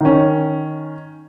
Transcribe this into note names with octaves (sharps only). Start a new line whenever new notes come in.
D#3 C#4